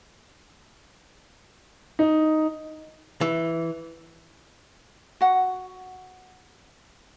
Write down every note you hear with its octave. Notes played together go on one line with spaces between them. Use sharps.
D#4
E3
F#4 F#5